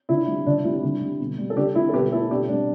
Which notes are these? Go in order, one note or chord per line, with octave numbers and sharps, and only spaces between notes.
D3 E4
G3
D3 D4
G3 E4
D3
G3
B2
G3
A4
D3 D4 G4
G3 E4
A4
B2 G4 B4
A3 E4 A4
B2 D4 G4
G3 D4